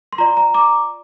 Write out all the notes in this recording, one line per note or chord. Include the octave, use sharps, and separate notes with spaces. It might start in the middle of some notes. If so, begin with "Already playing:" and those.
C6
F4 D5 A#5
A#5
A#5 D6